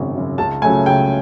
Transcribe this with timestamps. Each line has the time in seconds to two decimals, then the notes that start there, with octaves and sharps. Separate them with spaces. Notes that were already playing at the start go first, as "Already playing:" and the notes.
Already playing: G#1 F#2 C#3
0.14 F#2 C#3
0.38 C#2 A5
0.62 C#3 F#3 A3 G#5
0.86 C#2 G5